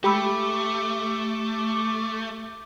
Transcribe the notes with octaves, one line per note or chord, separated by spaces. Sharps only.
G#3 A3 G4 B5 D6 E6